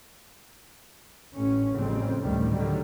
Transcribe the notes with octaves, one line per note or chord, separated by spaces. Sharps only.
A1 C#4
A1 F2 C#3 G3 C4
A1 D2 A2 C3 D#3 G3
D3 D#3 F#3 G3